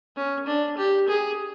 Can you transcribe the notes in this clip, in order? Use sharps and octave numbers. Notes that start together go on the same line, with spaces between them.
C#4
D4
G4
G#4